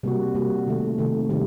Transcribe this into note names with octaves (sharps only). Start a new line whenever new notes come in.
C3 G3 A#3 F#4
C3 G3 A#3 F#4
C3 D#3 A3
C3 D#3 A3
C3 D#3 G3